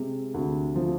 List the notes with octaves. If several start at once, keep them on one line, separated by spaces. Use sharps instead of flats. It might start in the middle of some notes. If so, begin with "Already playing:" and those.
Already playing: C3 G#3
D2
F3